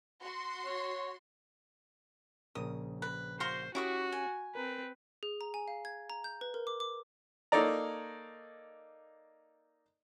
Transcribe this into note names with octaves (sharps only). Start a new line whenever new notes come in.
F#4 C6
C#5
A#1 C#3 A#4 D#6
B4
F#4 C5 F5 C6
C#4 E4 F#4 G4 C#6 D#6
G#5
C4 A#4 B4
G#4
A#5
G#5
F5
G#6
A#5
G6
B4
A#4
D6
D6
A#3 D#4 A4 C#5 D5 A#5